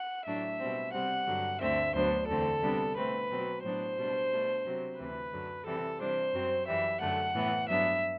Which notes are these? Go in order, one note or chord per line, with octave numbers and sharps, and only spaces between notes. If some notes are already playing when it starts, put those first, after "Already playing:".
Already playing: F#5
A2 F#3 A3 D4 E5
B2 G3 C4
C3 G3 C4 F#5
G2 D3 F#3
D2 D3 A3 C4 E5
D2 D3 F#3 B3 D4 C5
E2 D3 A3 C4 A4
C3 G3 B3 D4
B2 A3 C4 B4
B2 F#3 C4
A2 F#3 B3 D4 C5
B2 G3 D4
B2 A3 D4
C3 F#3 C4
D2 C3 E3 B4
F#2 D3 F#3
C3 E3 G3 A4
C3 E3 G3 D4 C5
F#2 F#3 C4
F#2 E3 G3 E5
F#2 D3 A3 F#5
A2 E3 B3
G2 F#3 B3 D4 E5